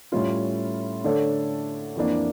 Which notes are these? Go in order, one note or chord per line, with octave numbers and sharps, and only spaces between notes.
A2 G3 C#4 F4
D3 A3 D4 A4 C#5
F2 E3 A#3 D4